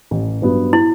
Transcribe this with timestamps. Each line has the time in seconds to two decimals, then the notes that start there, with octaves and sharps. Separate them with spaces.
0.11 A1
0.42 G2 F#3 B3
0.73 E4